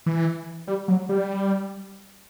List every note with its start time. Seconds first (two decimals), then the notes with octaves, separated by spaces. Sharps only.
0.06 E3
0.67 G3
0.88 F#3
1.09 G3